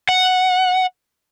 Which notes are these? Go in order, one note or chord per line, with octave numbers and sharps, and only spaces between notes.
F#5